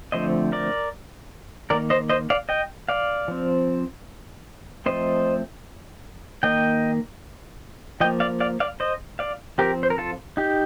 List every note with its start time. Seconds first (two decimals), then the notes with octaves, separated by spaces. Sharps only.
0.12 D3 F3 A3 C4 C5 D#5
0.52 A#4 D5
1.70 D#3 A#4 D5
1.73 A#3
1.90 C5 D#5
2.09 C5 D#5
2.30 D5 F5
2.49 D#5 G5
2.89 D5 F5
3.28 F3 C4
4.86 F3 A3 C4 C5 D#5
6.43 D#3 A#3 D#5 G5
8.00 F3 D#5 G5
8.04 A#3
8.20 D5 F5
8.40 D5 F5
8.60 D5 F5
8.80 C5 D#5
9.19 D5 F5
9.58 F3 C4 G4 A#4
9.83 C5
9.90 A#4
9.98 F4 A4
10.37 D#4 G4